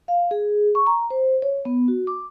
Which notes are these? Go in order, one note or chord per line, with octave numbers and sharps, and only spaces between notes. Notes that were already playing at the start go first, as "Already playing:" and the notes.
F5
G#4
C#6
A#5
C5
C#5
B3
F#4
D6